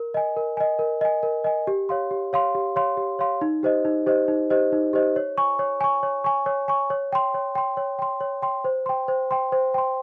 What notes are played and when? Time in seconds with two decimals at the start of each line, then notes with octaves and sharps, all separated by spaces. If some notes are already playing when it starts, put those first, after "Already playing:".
Already playing: A#4
0.14 D#5 G#5
0.37 A#4
0.57 D#5 G#5
0.79 A#4
1.01 D#5 G#5
1.23 A#4
1.44 D#5 G#5
1.67 G4
1.89 C#5 F5 C6
2.11 G4
2.33 C#5 F5 C6
2.55 G4
2.76 C#5 F5 C6
2.97 G4
3.19 C#5 F5 C6
3.41 D#4
3.63 G4 C5 D#5
3.85 D#4
4.06 G4 C5 D#5
4.28 D#4
4.50 G4 C5 D#5
4.72 D#4
4.93 G4 C5 D#5
5.16 C#5
5.38 G#5 C#6
5.59 C#5
5.81 G#5 C#6
6.03 C#5
6.24 G#5 C#6
6.46 C#5
6.68 G#5 C#6
6.90 C#5
7.13 G5 C6
7.34 C#5
7.55 G5 C6
7.77 C#5
7.99 G5 C6
8.20 C#5
8.42 G5 C6
8.64 C5
8.86 G5 C6
9.08 C5
9.31 G5 C6
9.52 C5
9.74 G5 C6